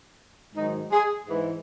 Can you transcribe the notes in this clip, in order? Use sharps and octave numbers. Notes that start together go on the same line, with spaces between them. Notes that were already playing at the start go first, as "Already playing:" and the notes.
G#2 D#3 F#3 D#4
G#4
G#2 E3